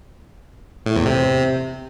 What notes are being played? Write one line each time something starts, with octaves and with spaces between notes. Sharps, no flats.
A2
E2
C3